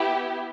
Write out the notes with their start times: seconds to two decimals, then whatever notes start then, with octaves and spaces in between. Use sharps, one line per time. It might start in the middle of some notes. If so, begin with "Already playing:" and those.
Already playing: B3 E4 G4